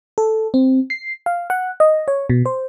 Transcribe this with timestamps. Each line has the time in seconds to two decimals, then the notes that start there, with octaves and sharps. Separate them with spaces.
0.18 A4
0.54 C4
0.90 C7
1.26 F5
1.50 F#5
1.80 D#5
2.08 C#5
2.30 B2
2.46 C5